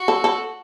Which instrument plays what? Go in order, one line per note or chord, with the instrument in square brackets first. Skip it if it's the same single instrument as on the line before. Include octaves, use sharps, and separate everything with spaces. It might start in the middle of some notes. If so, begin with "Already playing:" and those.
Already playing: [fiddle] F#4
[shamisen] A4
A4